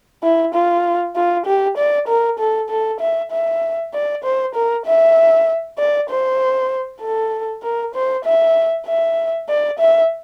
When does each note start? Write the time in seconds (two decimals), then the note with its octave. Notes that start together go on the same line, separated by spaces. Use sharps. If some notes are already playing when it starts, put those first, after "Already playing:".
0.23 E4
0.54 F4
1.16 F4
1.46 G4
1.77 D5
2.08 A#4
2.39 A4
2.69 A4
3.01 E5
3.31 E5
3.94 D5
4.24 C5
4.55 A#4
4.86 E5
5.78 D5
6.09 C5
7.01 A4
7.63 A#4
7.95 C5
8.25 E5
8.87 E5
9.49 D5
9.79 E5